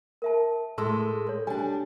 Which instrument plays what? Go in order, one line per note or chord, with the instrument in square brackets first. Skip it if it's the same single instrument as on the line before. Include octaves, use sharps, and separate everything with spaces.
[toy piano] A#4 E5 A5
[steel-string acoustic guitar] A2 G#3 A4 [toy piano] G#4 C6 E6
[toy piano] A4 C#5
[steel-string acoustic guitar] G3 D4 [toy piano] G#5